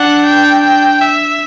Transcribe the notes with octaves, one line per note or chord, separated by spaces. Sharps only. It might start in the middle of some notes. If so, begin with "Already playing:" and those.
Already playing: D4 F#5
G5
G5
E5